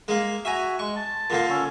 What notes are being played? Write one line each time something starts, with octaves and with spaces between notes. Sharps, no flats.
G#3 A#3
F#4 E5 G#5 A#5
G#3 C#6
A5
A#2 D3 A#3
C#4 A4 C#5